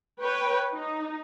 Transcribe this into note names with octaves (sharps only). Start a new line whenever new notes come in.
B4 C#5 G5
D#4